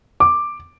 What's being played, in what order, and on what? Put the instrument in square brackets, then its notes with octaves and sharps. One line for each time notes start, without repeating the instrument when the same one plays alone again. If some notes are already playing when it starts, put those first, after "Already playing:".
[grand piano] D6